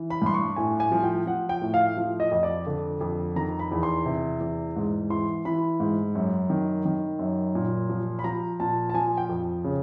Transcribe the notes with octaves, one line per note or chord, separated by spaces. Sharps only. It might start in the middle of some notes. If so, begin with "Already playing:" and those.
Already playing: E3
B5
G2 C6
C#6
A2 G#5
G#5
F3
G5
F3 F#5
G5
A2
F5
F3
D#5
F2 D#5
D5
D3
F2
D#3 A#5
B5
E2
C6
C3
E2
G#2
E3 C6
E3 B5
G#2
F#2
D#3
D#3
F#2
A#2
F3
B5
F3 A#5
A#2 A5
A5
F3 G#5
G5
F2
C#3